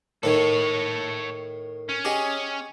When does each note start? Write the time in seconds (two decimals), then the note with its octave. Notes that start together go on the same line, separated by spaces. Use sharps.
0.23 A2 D#3 A4 C#5
1.89 C#4
2.05 G4 G#4 D#5